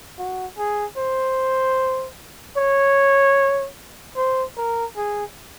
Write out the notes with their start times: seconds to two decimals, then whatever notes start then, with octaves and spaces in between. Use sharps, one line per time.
0.18 F#4
0.58 G#4
0.97 C5
2.57 C#5
4.16 C5
4.57 A#4
4.96 G#4